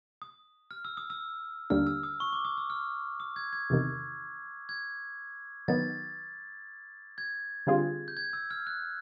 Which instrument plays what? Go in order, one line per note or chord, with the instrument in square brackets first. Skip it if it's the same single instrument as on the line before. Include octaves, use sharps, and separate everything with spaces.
[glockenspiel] D#6
F6
E6
D#6
E6
[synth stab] D#2 D3 G3 A#3 D4 [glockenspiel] F6
[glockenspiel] E6
D#6
C#6
D6
D#6
E6
F6
D#6
G#6
G#6
[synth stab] E2 C3 D#3
[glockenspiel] G#6
[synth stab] D#3 F#3 B3 [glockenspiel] A6
[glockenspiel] G#6
[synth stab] D3 G3 C4 F4 G#4
[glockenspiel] G6
G#6
E6
F6
F#6